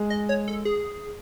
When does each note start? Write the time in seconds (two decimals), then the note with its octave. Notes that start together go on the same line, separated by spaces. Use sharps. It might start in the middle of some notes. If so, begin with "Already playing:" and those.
Already playing: G#3
0.10 D#5
0.29 C#5
0.48 A4
0.65 G#4